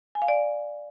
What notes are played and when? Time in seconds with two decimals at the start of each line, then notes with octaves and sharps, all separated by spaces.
0.15 G#5
0.22 F5
0.28 D5